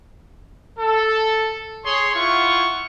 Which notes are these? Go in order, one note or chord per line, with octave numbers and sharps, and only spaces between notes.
A4
G#4 C#5 C6
E4 F4 F#5 C#6